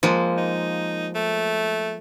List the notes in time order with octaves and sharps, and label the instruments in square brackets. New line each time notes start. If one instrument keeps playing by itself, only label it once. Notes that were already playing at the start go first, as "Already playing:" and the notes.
[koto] F3 G#3 A#3
[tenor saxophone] D#4
A3